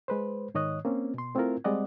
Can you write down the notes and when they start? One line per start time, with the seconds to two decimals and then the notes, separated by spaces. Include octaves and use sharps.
0.08 G#3 B4 C5
0.54 G#2 D#3 C#5 D#5 D#6 F#6
0.85 A#3 C4 C#4
1.14 B2 C6
1.35 A3 C4 E4 F4 A#4
1.64 G3 G#3 C4 D5 D#5 F#5